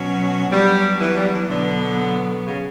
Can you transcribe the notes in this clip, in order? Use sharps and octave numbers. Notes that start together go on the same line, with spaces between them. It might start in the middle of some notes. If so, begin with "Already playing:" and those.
Already playing: B2 F#3 C#4 F#4
F#3 G3 B3 D4 F#4
E3
G3
E3
B2 D3 F#3 B3
C#3